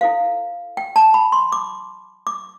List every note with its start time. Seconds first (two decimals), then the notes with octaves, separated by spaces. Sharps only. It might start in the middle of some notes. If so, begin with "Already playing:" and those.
0.01 E4 A4 C5 F5
0.77 G5
0.96 A5
1.14 B5
1.32 C6
1.52 D6
2.27 D6